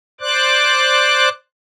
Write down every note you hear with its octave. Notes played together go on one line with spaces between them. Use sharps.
C5 D5 D6 F#6